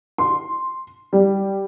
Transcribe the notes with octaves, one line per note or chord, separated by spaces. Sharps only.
C6
G3